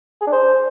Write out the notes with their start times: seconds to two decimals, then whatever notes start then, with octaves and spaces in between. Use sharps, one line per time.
0.21 G#4
0.27 D4
0.32 C5